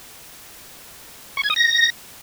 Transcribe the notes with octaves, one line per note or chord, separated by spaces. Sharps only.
C#6
G#6
D#6
A#6